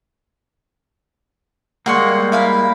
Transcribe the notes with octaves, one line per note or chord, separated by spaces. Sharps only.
G3 G#3 A#3 F#5 C6 C#6
E4 F5 B5